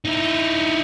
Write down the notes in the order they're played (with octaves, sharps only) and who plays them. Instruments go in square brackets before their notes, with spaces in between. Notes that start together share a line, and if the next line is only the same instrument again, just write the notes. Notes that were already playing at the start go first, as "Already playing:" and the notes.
[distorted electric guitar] D#4 E4